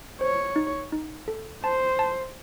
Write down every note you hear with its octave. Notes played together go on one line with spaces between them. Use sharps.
C5 C#5
D#4
D#4
A4
C5 A5
A5